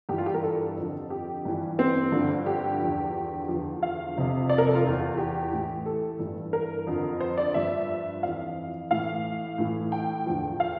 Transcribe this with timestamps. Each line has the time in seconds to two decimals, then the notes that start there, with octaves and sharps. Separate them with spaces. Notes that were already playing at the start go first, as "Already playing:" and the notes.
0.09 G2 G4
0.13 E3
0.18 F4
0.26 G4
0.34 A#4
0.44 A4
0.77 F2 D3 F3
1.10 G4
1.45 G2 E3
1.79 C4
2.12 G2 D3 F3
2.46 G4
2.80 E2 D3 F3
3.48 E2 D3 F3
3.83 F5
4.16 F2 C3 F3
4.49 D5
4.58 A#4
4.67 A4
4.75 F4
4.84 E2 E3
5.17 G4
5.52 A2 E3
5.86 A4
6.19 G2 E3
6.53 A#4
6.87 F2 D3 F3
7.20 C5
7.38 D5
7.54 G2 F3 E5
8.23 F2 E3 F5
8.91 A2 E3 F5
9.58 A2 E3
9.92 G5
10.26 E2 D3 F3
10.60 F5